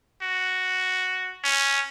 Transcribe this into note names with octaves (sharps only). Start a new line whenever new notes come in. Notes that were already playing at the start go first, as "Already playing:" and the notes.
F#4
C#4